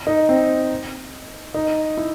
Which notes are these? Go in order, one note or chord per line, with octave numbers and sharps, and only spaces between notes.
D#4
C4
D#4
E4